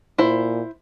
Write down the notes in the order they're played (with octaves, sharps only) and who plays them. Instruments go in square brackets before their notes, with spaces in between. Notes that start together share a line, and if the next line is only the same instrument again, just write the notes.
[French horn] A#2 [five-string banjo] E4 C5